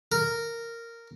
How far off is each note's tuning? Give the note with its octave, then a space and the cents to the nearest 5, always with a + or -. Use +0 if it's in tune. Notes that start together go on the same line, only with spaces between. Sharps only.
A#4 -10